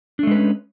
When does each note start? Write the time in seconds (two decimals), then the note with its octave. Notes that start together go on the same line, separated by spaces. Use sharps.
0.19 D4
0.23 A3
0.27 G#3
0.31 B4
0.35 C#4